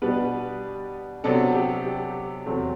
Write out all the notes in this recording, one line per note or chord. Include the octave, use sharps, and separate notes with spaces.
B2 G3 B3 D4 B4
C3 F#3 B3 D4 A4
G4
G4
E2 C3 F#3 A3 C4